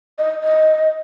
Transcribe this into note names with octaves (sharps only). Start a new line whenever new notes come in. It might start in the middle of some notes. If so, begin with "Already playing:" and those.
D#5
D#5